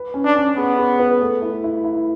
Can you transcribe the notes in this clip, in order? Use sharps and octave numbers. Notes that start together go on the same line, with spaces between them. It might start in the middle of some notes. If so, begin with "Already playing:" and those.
Already playing: B4
C#4
D4
C#4
B3 G#4
G#4
B4
A3
E4
E4
E4